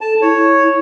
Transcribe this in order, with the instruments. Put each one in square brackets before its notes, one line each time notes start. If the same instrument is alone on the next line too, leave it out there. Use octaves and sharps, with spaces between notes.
[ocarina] A4 [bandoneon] A5
[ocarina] E4 [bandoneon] C#5